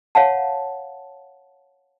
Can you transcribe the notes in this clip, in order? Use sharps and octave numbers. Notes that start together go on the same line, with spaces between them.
C#5 F5 F#5 A5